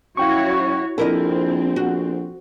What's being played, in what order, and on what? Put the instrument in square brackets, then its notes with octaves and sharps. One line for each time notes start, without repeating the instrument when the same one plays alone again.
[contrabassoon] F#2 [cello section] E4 F#4 C#5 [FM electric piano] F5 G5 C#6
[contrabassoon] A#1 [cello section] C4 [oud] E4 A#4 D#5 [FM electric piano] A4
[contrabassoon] A#1 [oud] F#4